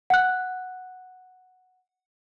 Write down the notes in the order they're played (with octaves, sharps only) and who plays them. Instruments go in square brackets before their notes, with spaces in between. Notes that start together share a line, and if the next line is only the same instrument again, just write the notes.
[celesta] F#5 F#6